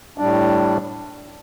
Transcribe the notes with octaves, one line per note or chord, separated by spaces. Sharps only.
A2 G3 D4